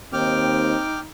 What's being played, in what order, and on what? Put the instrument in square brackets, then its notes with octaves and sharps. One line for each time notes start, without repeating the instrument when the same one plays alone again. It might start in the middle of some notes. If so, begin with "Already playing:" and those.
[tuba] D#2 [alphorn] C4 [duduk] D#4 [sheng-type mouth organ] G5 D6 F6